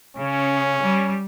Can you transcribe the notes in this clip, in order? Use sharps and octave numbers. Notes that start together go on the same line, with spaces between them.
C#3 C#4
G3